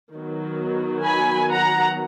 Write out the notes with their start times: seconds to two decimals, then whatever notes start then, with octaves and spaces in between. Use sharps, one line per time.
0.12 D#3 F#3 B3
1.05 G#5 B5
1.51 F#5 A#5